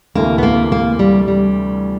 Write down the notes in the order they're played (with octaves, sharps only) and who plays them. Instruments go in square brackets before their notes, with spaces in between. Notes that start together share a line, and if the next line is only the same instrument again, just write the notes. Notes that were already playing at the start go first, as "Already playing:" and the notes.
[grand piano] D2 C3 E3 A3 [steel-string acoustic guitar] A#3
[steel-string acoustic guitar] B3
A#3
A#3
G3
G3